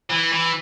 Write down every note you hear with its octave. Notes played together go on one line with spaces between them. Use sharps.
E3
E3